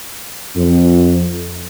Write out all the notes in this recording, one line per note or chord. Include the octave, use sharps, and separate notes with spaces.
F2